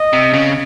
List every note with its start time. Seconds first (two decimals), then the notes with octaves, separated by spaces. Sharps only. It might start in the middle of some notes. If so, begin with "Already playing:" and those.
Already playing: D#5
0.13 C3
0.34 C#3